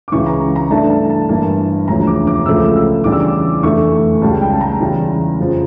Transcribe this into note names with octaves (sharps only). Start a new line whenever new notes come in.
D6
C#2 C#3 E3 C#6
A#5
A#5
G2 E3 A3 D4 A5
A5
A5
G1 G2 E3 A#3 A5
E1 D2 C#3 F3 C#4 A#5
D6
D6
C#2 C#3 F3 A3 E6
E6
E2 C#3 G3 D4 D6
E6
D6
F1 E2 D3 A3 C#6
C#2 C#3 G3 A5
G5
A5
A#5
E2 C#3 G3
F2 C#3 F3